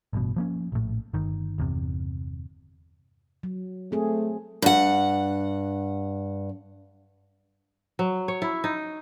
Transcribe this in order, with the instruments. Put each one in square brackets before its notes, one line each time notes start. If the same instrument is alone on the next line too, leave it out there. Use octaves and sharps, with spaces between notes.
[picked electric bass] A1 G2 B2
F3 A#3 C#4
A#1 A2
G1 D#3
G1 E2 C3
[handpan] F#3
[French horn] A3 [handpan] C4 G#4
[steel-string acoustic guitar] G2 F#5
[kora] F#3
C#5
E4
D#4